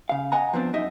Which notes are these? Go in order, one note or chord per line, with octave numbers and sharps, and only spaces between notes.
C#3 F5
D#5 F#5 G#5 A#5
F3 B3 C4 D4
F#2 D#4 D#5 E5